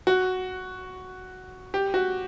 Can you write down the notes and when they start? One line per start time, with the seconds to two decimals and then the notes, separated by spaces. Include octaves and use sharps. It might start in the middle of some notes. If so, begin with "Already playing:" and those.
0.07 F#4
1.74 G4
1.94 F#4